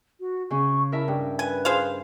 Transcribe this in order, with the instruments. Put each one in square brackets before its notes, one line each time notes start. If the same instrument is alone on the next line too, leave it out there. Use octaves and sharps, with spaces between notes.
[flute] F#4
[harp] C#3 C#4 [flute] C#6
[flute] E4 [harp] A#4 E5 A5
[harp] G2 [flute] G5
[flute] B4 [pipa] G#5
[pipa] G#4 C5 F5